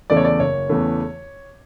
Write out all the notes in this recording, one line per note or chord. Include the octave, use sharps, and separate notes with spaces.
E2 C#3 E3 A3 D5
C#5
D5
F#1 C#5
E2 C#3 E3 A3